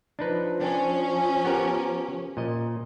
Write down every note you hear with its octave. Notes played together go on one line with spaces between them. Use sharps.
F3 D4 D#4 B4
C#4 D4
B3 G4 A#4
A#2 D#5